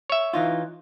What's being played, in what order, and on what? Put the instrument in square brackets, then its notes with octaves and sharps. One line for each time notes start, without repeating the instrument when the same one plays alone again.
[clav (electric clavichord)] C#5 E5
[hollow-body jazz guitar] E3 D#4 F4